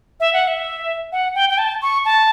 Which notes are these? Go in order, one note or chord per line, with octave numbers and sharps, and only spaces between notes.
E5
F#5
E5
F#5
G5
G5
A5
C#6
A5